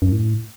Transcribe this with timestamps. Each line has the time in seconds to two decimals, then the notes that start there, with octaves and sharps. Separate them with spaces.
0.02 F#2
0.12 A2